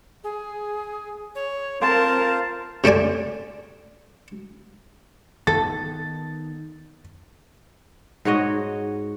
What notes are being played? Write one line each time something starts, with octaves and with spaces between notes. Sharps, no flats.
G#4
C#5
C4 F4 A#4 C5 F5 A5
C3 A3 C4 D5 G#5
D#3 B3 A4 A6
G#2 F#4 C#5 D#5